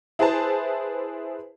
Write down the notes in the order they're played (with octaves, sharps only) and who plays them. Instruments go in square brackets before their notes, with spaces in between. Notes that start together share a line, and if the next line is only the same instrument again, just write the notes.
[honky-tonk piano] E4 G#4 B4 C5 A5